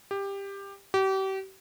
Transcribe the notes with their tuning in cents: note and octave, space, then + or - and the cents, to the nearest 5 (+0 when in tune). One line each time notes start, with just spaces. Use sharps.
G4 +15
G4 -35